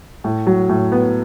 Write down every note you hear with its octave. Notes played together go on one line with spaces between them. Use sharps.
A2
F#3
A2
B3